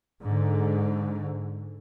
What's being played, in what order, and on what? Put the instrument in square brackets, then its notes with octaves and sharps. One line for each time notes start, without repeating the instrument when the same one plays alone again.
[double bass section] G#2 D3